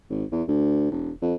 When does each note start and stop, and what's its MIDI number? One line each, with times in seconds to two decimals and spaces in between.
0.10 0.24 32
0.32 0.42 40
0.48 0.90 38
0.91 1.10 28
1.22 1.34 41